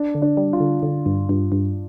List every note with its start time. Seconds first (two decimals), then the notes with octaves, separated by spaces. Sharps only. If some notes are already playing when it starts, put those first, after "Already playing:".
Already playing: D4
0.15 D3
0.22 D4
0.37 G3
0.53 F4
0.60 D3
0.83 D3 D4
1.06 G2
1.29 G2 F4
1.52 G2